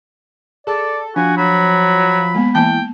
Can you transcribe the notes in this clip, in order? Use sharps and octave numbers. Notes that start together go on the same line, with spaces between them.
G#4 A4 D5
F3 D4 F#4 G#5
F#3 B5
G#3 A#3 B3
E3 A#3 G5 A5